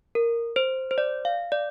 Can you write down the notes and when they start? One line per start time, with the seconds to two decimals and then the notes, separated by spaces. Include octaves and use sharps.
0.15 A#4
0.56 C5
0.91 C5
0.98 D5
1.25 F5
1.52 D5